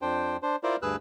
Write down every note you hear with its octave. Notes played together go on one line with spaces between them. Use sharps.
F2 D4 C5 G5
D4 C5
E4 F4 A#4 C5 D5
D2 G2 G#4 B4 E6 F#6